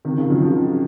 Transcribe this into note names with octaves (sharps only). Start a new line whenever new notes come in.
C3 D#3
C#3 F3
D#3 F#3
C#3 F3